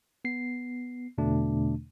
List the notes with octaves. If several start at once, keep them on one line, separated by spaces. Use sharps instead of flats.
B3 C7
E2 B2 D3 A3 D4